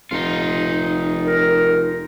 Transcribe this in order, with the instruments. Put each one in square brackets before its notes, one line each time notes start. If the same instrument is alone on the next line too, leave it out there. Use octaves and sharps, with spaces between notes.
[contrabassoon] F1 [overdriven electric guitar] D#4 F4
[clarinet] A#4